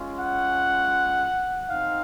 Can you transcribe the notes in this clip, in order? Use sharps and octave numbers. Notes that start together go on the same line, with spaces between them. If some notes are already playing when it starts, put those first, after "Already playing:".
Already playing: G#3 C#4 F4
F#5
C4 D#4 F5